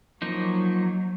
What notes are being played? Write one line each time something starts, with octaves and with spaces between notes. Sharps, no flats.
F3 F#3 A#3 D#4